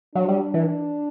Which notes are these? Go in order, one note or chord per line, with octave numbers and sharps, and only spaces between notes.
F#3 D4
G3
E3